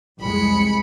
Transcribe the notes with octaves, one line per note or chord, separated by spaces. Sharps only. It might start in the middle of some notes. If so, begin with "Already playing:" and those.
C2 F2 G#3 B5 C#7